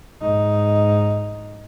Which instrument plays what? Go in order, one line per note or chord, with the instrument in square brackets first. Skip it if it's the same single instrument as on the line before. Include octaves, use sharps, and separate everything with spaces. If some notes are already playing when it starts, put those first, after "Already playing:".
[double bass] G#2 D#4